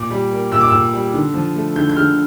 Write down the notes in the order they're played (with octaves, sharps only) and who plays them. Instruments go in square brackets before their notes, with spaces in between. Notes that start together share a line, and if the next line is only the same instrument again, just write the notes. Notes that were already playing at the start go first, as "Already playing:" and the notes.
Already playing: [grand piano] A#2 D6
G3
A#3
A#2 E6
D6
A#2 E6
G3
D3
F3
A3
D3 G6
G6
D3 F6